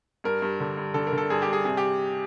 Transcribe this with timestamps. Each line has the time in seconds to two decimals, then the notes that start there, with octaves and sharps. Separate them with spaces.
0.24 G2 A#4
0.42 G2
0.60 D3
0.77 G2
0.94 D3 A4
1.07 A#4
1.12 D3
1.18 A4
1.30 G2 G#4
1.42 G4
1.48 G2 G#4
1.65 C3 G#4
1.77 G4